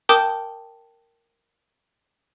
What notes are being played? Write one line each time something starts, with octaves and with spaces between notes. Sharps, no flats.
A#4 G5 A5 D6 D#6 G6